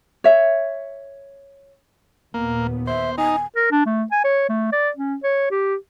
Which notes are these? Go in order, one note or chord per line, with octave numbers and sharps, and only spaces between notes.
C#5 E5
D#2 A#2 A#3 B3
C5 E5
D#4 G#5
A#4
D4
A3
G#5
C#5
A3
D5
C#4
C#5
G4